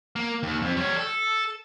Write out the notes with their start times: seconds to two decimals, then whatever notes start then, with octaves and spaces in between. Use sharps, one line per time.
0.16 A#3
0.43 D#2
0.62 F2
0.77 G3 C#5
0.97 A4